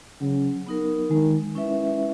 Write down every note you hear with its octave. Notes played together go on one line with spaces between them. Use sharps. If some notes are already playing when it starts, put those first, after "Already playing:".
C#3 F#3
B3 D#4 A#4
D#3 G#3
C#4 E4 B4 E5